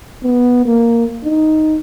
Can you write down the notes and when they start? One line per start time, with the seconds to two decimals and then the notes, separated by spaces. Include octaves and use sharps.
0.23 B3
0.65 A#3
1.24 D#4